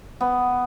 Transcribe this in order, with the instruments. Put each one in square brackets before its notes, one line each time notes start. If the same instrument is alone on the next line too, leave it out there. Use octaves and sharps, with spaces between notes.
[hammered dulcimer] B3